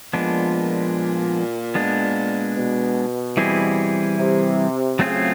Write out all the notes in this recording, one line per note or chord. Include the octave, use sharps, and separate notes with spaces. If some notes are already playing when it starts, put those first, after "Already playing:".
A#2 F3 G#3 B3 D4
G#3 B3 D4
B2
E3 G3 C4 E4 G#4
C3
C#3 F#3 A3 C4 F4 G#4